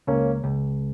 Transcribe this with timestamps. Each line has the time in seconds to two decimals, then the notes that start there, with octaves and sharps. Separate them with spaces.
0.07 C#2 A#3 C#4
0.44 C#2